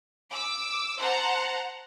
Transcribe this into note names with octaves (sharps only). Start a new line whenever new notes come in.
D6 E6
C5 F#5 A5 A#5